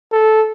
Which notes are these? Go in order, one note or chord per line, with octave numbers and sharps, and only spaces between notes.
A4